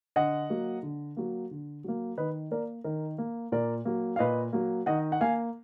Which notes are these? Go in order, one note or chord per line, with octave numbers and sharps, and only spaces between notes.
D3 D#5 F#5
F#3 A#3
D3
F#3 A#3
D3
F#3 A#3
D#3 B4 D#5
A#3 A#4 D5
D#3 A#4
A#3
A#2 A#4 D5
F#3 A#3
F5
A#2 B4 D#5
F#3 A#3
D#3 D#5 F#5
F#5
A#3 F5 G#5